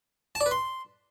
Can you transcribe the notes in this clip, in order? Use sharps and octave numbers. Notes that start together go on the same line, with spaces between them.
A5
D5
B4
C6